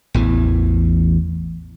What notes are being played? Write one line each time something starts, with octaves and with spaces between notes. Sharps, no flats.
A1 E2 E3